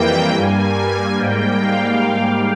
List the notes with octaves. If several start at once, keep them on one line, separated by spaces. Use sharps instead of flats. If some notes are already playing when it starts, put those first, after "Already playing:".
Already playing: F2 E3 G3 A#3 G5
G2 G3 A#3 G#5
G#2 G3 A#3 G5
F5